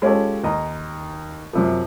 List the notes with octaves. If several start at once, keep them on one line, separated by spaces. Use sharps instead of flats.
G#3 C#4 F4 G4 A4
D#2 D#5 A#5
F#2 C3 F3